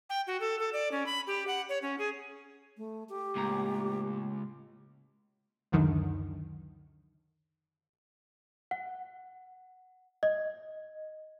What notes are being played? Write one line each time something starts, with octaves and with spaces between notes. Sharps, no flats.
G5
F#4
A4
A4
D5
C#4
B5
G4
F#5
C#5
C#4
G#4
A3
G4
C#2 A2 A#3 A#5
C#2 F#2 D3 D#3
F#5
D#5